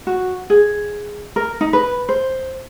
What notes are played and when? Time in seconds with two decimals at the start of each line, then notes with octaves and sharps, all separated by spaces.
0.07 F#4
0.50 G#4
1.36 A#4
1.61 D#4
1.73 B4
2.09 C5